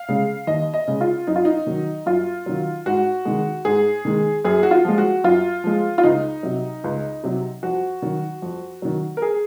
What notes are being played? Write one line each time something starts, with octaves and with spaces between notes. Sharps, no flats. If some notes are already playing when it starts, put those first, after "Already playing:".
Already playing: F5
C#3 G#3
D#2 D#5
D#5
C#3 G#3
F4
F#2 D#4
F4
D#4
D#3 F#3
F#2 F4
D#3 F#3
G#2 F#4
D#3 G#3
G#2 G#4
D#3 G#3
F#2 G#4
F#4
F4
F3 G#3
F#4
F#2 F4
F3 G#3
F4
C#2 D#4
C3 F#3
C#2
C3 F#3
F2 F#4
D#3 F#3
F2
D#3 F#3
A#4
G#4